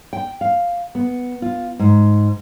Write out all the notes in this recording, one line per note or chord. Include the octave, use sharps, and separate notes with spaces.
G5
F5
B3
F4
G#2